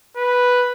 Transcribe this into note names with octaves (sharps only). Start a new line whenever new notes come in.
B4